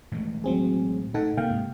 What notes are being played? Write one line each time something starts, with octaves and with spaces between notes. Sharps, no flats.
A2 E3 G#3
F#3 C4 G#4
A2 D#4 A4 F#5
C3 A#3 F5 G5
G#2